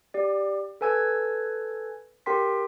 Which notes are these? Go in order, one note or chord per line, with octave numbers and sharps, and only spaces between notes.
G4 D5
A4 B4 G#5 E6 G#6
G4 A#4 G5 C6 B6